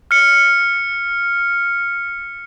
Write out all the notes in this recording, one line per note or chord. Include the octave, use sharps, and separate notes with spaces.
F6 C#7